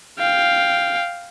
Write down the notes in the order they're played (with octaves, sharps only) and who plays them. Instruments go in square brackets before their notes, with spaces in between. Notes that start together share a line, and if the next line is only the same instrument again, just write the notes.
[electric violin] F5 G5